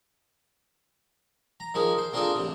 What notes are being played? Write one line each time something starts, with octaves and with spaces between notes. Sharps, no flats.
A#5
D#3 F3 A#3 G#4
C5
A#3 C4 D4 F4 G#4 A4
A1 C3